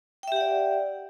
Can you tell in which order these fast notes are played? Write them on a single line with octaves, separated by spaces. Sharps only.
G5 E5 G4 F#5 D5